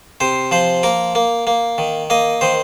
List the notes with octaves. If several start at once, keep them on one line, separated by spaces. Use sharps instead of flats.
C3 C5
F3 C5
A#3 A#4
A#3
A#3
D#3
A#3 D#5
D#3 C5